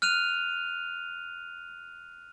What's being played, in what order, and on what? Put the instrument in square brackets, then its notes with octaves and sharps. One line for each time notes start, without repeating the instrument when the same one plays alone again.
[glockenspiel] F6 F#6 D#7 F7